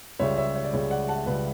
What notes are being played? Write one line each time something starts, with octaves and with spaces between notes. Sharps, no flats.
C#2 C#3 G3 C#5 E5
C#5 E5
C#5
D5
C#2 C#3 G3 C#5
D5 F#5
F#5 A5
C#2 C#3 G3 B4